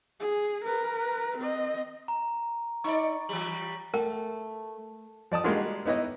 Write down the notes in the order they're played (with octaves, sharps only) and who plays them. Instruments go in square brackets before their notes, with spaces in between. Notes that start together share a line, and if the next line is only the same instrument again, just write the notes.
[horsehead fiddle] G#4
A#4 B4
C4 D#5
[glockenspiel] A#5
[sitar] D#4 D5 [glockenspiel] C#6
[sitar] E3 G3 [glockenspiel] C#6 F#7
[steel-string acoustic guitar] A3 [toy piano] A#4 G5 [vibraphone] A5
[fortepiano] F3 D5 A5 D#6
G3 G#3 A#3 D4 F4 F#4
B3 D#4 E4 B4 C#5 D#5